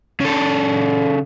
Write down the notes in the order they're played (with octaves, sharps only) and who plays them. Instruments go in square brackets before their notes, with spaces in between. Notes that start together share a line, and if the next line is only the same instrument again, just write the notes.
[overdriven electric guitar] C#3 A4